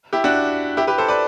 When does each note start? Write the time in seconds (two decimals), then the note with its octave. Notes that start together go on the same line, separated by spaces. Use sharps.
0.13 E4 G4
0.24 D4 F#4
0.77 E4 G4
0.87 G4 B4
0.98 A4 C5
1.08 B4 D5